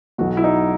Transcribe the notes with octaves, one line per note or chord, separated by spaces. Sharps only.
B1 B2 F#4
E4
D#4